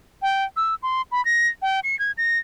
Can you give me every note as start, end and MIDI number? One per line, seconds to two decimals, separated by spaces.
0.22 0.44 79
0.57 0.75 88
0.83 1.02 84
1.12 1.24 83
1.25 1.47 94
1.62 1.80 79
1.83 1.98 97
1.99 2.11 92
2.18 2.39 94